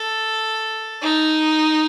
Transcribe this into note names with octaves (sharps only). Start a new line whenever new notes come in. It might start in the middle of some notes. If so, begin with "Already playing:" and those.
Already playing: A4
D#4